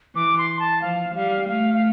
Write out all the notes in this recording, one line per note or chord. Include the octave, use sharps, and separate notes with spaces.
E3 D6
C6
A5
F3 F5
G3 F5
A3 F5
F5